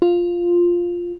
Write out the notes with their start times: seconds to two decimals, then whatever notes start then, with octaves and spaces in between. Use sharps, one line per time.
0.02 F4